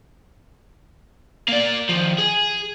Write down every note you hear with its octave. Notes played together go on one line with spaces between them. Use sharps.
A#3 D5
D#3 F3
G#4